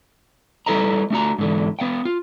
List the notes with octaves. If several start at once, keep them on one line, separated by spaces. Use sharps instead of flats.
G3 E4 A4 B4 D#5 A#5
A3 D4 F#4 A#5
G#2 D3 E3
B3 F5 G5
F4